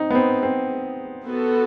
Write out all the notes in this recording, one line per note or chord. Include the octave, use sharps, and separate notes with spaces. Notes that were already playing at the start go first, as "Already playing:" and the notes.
Already playing: C4 D#4
B3
C4
C4
B3 F#4 A4